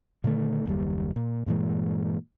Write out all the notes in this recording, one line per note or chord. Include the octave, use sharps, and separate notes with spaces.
A#2 D3 D#3 A3
F#1 D#2 G3
A#2
G2 A#2 E3 G#3